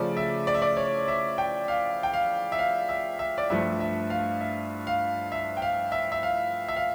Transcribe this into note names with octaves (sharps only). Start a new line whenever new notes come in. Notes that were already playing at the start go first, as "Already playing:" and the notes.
Already playing: C#3 F3 A3 D5
E5
D5
E5
D5
C#5
E5
G5
F5
G5
F5
E5
F5
E5
E5
D5
G2 F3 A3 E5
E5
F5
E5
F5
E5
G5
F5
E5
E5
F5
E5
F5